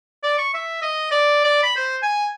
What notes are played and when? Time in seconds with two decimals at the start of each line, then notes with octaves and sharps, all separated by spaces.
0.23 D5
0.38 C#6
0.54 E5
0.82 D#5
1.11 D5
1.44 D5
1.63 B5
1.76 C5
2.03 G#5